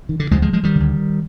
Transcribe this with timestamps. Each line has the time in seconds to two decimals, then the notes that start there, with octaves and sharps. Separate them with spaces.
0.09 D#3
0.20 D3
0.31 D2 D3 F3 G#3
0.42 F3 G#3
0.53 F3 G#3
0.63 D#3 G3
0.75 D2 D3